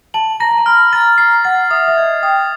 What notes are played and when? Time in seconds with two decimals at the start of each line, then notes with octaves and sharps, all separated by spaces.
0.14 A5 F#7
0.40 A#5 A#6
0.51 A5
0.58 A#5
0.66 B5 F6
0.93 A#5 A6
1.18 A#5 C7
1.44 F#5 A6
1.71 E5 D#6
1.88 E5
1.97 D#5 G#6
2.23 G5 D#6